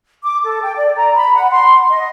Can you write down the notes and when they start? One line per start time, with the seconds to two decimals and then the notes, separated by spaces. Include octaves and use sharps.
0.23 D6
0.44 A4
0.63 G5
0.76 D5
0.97 A#5
1.15 B5
1.35 F#5
1.51 C6
1.90 D#5